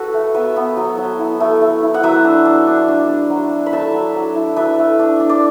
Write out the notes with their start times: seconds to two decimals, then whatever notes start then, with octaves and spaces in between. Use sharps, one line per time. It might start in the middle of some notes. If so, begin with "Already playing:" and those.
Already playing: F#4 A4 B4
0.14 A3
0.34 B3 B4 E5
0.56 B3
0.77 F#3
0.98 F#3
1.19 E4
1.40 A3
1.61 A3
1.83 E4
1.94 F#5
2.03 F#3 B4 E5
2.24 D4
2.45 D4
2.67 D4
2.88 D4
3.09 D4
3.30 F#3
3.51 D4
3.66 B5
3.72 A3 E5 A5
3.93 F#3
4.15 F#3
4.36 E4
4.56 D4 B4 E5
4.78 A3
4.99 D4
5.20 D4
5.29 D5